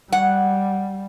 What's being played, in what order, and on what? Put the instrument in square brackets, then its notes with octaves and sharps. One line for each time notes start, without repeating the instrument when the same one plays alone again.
[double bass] G3 [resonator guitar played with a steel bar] F#5